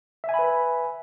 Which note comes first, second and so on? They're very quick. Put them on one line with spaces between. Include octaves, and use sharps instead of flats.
E5 G#5 B5 B4